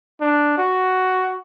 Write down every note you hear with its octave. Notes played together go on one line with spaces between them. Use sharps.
D4
F#4